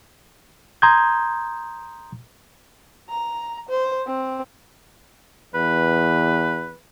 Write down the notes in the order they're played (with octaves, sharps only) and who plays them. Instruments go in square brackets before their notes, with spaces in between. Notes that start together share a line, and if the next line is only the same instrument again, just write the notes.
[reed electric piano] A#5 C6 D#6 G6 G#6
[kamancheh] A#5
C5
C4
[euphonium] E2 [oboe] B4